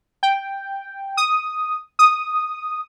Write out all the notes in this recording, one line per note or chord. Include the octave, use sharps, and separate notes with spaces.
G5
D#6
D#6